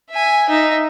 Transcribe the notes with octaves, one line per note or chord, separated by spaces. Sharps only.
E5 G#5
D#4 E5